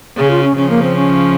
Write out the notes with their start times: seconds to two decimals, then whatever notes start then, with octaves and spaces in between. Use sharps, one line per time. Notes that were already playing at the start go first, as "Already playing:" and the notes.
0.18 C#3 G#4
0.31 F4
0.44 C#4
0.56 C#3 F3 C#4
0.70 A#3
0.82 C4
0.96 C#4